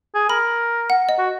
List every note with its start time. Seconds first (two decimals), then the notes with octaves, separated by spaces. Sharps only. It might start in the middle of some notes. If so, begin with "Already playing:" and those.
0.15 G#4
0.29 A#4 B5
0.90 F#5
1.09 D#5
1.18 F#4